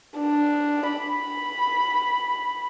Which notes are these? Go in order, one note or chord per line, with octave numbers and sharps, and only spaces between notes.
D4
B5